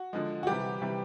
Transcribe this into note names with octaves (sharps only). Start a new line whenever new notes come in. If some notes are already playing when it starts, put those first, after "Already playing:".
Already playing: F#4
D3 F3 G#3
F#4
C3 E3 G3 G4
C3 E3 G3